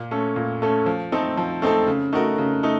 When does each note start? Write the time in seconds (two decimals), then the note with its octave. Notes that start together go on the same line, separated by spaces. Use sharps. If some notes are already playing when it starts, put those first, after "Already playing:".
Already playing: A#2
0.11 A3 C#4 A4
0.36 A#2
0.62 A3 C#4 A4
0.86 F3
1.12 A3 C4 D#4 A4
1.37 F3
1.62 A3 C4 D#4 A4
1.87 C#3
2.13 A3 D#4 F#4 A#4
2.38 C#3
2.63 A3 D#4